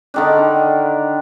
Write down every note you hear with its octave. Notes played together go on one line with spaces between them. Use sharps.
D3 D#3 D4